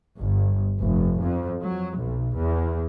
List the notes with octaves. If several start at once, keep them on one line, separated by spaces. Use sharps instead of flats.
G1
F1
F2
F#3
B1
E2